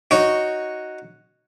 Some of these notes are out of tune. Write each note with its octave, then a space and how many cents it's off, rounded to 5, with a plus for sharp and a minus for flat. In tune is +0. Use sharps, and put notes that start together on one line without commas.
D#4 +0 F#4 +0 C#5 +0